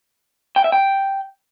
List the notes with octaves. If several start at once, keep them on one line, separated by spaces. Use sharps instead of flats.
G5
E5
G5